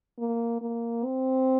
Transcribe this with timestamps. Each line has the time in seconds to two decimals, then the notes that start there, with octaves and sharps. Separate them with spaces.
0.19 A#3
0.61 A#3
1.04 C4